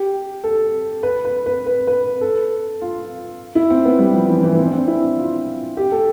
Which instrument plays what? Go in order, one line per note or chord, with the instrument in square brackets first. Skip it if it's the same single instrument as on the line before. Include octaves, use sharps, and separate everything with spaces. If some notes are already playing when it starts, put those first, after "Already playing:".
Already playing: [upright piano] G4
A4
B4
B4
B4
B4
B4
A4
F4
E4
C4
B3
G3
F3
E3
E3
B3
C4
D4
C4
E4
F4
G4
A4